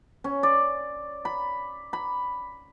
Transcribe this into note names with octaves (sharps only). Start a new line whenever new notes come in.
C#4
D5
B5
B5